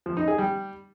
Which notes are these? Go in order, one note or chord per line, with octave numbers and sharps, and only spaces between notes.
F3
D#4
G#4
G3